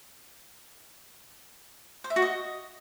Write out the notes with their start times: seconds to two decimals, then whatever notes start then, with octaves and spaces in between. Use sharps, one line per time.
2.04 C5
2.10 E5
2.16 F#4
2.22 D#5